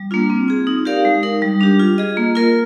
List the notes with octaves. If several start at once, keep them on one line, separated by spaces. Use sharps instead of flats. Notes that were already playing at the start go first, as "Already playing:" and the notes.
Already playing: G3
A#3 D4 F4
C4
F4 G#4
D#4
G4 A#4 D5 F5
G#3
D#4 A#4
G3
D4 G4
F4
G#4 D#5
A#3
F4 A#4